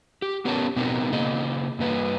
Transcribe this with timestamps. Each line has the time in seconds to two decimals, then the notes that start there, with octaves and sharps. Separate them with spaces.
0.22 G4
0.45 B3 C#4 G4 A#4 C#5 A5
0.76 B2 B3 C4 D#4 A#4
1.12 C#3 A#3 G#4 D#5
1.79 G2 A#3 B4